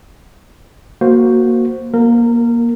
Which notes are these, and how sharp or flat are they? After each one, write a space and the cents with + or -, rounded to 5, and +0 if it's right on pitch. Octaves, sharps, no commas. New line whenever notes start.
A#3 +10 F#4 +0 C5 +0
A#3 +20 A#4 -20